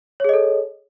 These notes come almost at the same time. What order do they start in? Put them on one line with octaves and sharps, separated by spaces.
C#5 G#4 D#5 A4